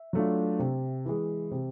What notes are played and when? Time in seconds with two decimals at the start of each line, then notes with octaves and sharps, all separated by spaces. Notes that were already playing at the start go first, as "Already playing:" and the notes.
Already playing: E5
0.13 F#3 A3 D4 F4
0.59 C3
1.06 E3 G#3
1.51 C3